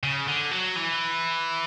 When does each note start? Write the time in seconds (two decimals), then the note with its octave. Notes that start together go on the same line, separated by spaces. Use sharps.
0.03 C#3
0.27 D3
0.51 F#3
0.76 E3